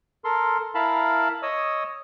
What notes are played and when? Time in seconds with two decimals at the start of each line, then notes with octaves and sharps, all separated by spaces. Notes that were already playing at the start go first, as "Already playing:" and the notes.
0.24 A4 A#4 C6
0.75 E4 A#4 F5 A5 B5
1.42 C#5 D#5 D#6 E6